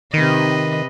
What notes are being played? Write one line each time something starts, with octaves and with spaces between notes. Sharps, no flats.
C3 D#3 B4 D#5